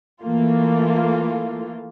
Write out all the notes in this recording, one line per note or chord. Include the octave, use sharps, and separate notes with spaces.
E3 A3 A#3 F4